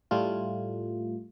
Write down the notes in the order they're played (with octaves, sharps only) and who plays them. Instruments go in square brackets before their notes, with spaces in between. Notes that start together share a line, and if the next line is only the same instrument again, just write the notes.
[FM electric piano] A2 G3 A3 F4